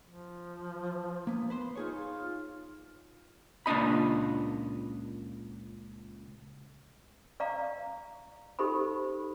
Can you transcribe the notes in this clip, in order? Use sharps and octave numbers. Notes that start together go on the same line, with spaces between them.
F3
A#3 B3
B4 C5 C6
D#4 F4 G#4 C#5
C#2 A#2 D4 D#5 B5
D5 F5 A#5
D#4 G4 A4 C5 B5